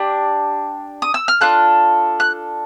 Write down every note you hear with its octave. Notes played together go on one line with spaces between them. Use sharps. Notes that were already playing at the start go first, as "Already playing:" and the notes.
Already playing: D4 G4
D#6
E6
F6
D4 F4 A4 F#6
F#6